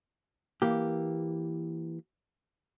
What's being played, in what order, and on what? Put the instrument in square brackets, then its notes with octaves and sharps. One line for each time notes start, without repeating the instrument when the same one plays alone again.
[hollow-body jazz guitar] E3 A#3 G4